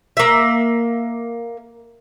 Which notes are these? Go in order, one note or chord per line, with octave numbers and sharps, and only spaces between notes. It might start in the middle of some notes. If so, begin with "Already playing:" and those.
A#3 E5